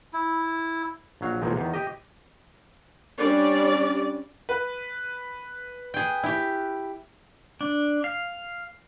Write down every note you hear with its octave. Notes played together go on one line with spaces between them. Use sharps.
E4
A#1 F#3 F5
B1 E2 A#2 F3 G#3
E2 D#3
G4 D#5
G3 C#4 D4 D5
B4
G#4 G5
E4 G4
D4
F5